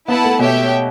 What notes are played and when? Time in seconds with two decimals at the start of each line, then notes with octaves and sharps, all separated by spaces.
0.08 B3 E4 B4 F#5 A5
0.24 A3
0.39 B2 G4 C#5 E5 G5